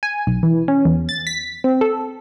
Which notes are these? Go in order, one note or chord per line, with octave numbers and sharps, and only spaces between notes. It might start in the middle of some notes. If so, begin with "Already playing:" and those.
G#5
B1
E3
C#4
E2
A6
B6
C4
A4